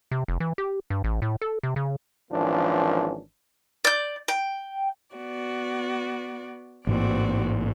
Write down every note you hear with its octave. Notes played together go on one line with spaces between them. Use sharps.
C3
F1
E3
G4
G2
A1
A2
A4
C3
C#3
G#1 E3 F3 A#3 C#4 D4
D5 G6
G5
B3 F#4 D5
A1 G#2 A#3 C4 F#4 D5